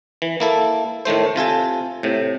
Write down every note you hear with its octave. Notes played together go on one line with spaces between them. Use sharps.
E3
A#3 E4 A4
A2 D#3 A3 C5
C3 F4 A4 G#5
A2 C3